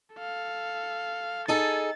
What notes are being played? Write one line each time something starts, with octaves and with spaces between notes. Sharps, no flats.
A4 F5
D#4 G#4 A4 A6